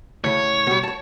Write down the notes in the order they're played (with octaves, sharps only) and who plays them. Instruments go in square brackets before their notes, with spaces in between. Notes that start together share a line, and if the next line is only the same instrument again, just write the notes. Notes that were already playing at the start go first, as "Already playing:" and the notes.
[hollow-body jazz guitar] A2 C#3 [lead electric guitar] C#5
[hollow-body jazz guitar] B2 G3
C#5 A5